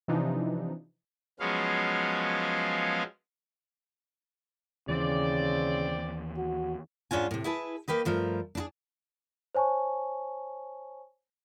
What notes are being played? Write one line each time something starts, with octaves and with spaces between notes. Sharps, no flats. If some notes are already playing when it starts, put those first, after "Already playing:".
C3 E3 F3 D4 D#4
F3 F#3 G#3 B3 C#4 F5
D#2 C#3 E3 C4 D5
F#4
G#2 C#4 D4 F4 G#5
A2 C3
E4 G#4 B4 A5
A#3 G4 B4 D#5
G2 F3 A3 A#4
D4 E4 G#4
C5 C#5 G#5 A5 C#6